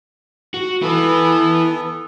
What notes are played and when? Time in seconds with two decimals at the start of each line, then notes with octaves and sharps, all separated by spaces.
0.54 F#4
0.82 B3 E4 A4 B4